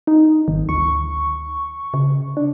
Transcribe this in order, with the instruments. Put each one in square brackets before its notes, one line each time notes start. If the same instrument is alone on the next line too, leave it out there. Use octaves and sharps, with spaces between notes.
[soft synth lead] D#4
[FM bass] G#1 [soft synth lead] D#3
[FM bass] D2 [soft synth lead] C#6
[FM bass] C#3
[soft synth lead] D4